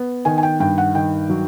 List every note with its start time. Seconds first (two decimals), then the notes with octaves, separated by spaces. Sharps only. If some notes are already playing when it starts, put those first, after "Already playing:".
Already playing: B3
0.25 D#3 G#5
0.38 G#5
0.43 G5
0.60 G2 G5
0.78 F#5
0.95 D#3 G5
1.30 F#3